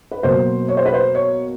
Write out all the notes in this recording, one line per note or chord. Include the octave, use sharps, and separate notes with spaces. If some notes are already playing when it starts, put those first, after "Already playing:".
B4
B2 F#3 A#3 C5
C#5
C5
B4
C5
C#5